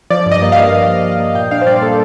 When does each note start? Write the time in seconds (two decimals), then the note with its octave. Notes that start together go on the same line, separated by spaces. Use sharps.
0.10 F3 D5
0.26 G2
0.31 D#5
0.42 A#3
0.52 G2 F5
0.73 G2
0.88 F3
1.05 F3
1.20 A#3
1.35 A#2 G5
1.51 D4 F5
1.61 C5
1.67 G3 D5
1.82 A#3 A4